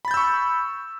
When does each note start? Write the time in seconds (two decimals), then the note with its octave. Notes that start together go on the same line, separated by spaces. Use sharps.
0.05 B5
0.08 A6
0.11 G6
0.14 E6
0.17 C#6